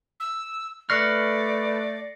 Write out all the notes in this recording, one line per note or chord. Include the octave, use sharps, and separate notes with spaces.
E6
A3 B4 D5 C#6 F6 A#6 C7 C#7